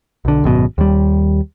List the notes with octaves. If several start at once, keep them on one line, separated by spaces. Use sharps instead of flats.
B1 D3
G#1 F#2 B2
D#2 G3